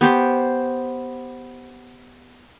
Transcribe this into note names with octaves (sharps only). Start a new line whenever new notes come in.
B3 G4 C5 C6